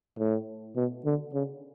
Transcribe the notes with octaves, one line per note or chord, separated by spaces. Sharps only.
A2
B2
D3
C#3